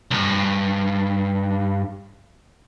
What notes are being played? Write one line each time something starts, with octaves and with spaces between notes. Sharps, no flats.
C2 G2